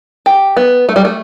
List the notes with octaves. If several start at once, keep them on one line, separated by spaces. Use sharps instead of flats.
G4
B3
A3
G3
A3